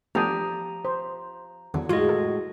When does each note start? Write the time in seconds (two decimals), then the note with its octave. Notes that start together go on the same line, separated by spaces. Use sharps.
0.15 F3 A3 B3 D4 G4 G5 A#5 D#6
0.85 C5
1.74 E2 D3 F#3
1.89 A2 G#3 F4 F#4 D#5
2.09 A4